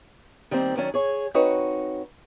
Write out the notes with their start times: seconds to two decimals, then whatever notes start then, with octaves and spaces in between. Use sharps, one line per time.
0.51 D#3 G3 A#3 C4
0.77 D#3 F#3 C#4 D4
0.94 G#4 C#5
1.34 C4 D#4 F#4 B4 C#5